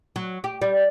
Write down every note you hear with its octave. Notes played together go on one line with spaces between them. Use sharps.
F#3
G4
G3